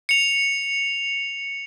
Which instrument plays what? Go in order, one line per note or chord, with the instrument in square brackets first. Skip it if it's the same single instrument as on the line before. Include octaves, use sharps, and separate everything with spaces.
[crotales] C#7 F7